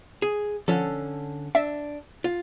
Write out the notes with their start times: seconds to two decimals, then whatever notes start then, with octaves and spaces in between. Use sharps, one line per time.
0.22 G#4
0.68 D3 F3 C#4 A4
1.55 D4 E5
2.24 F4